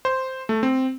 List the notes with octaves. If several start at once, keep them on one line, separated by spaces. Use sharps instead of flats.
C5
A3
C4